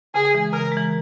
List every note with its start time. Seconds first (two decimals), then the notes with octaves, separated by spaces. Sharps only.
0.14 C#3 G#4
0.35 E3 G#3
0.53 C#3 A#4
0.72 G#3
0.77 E3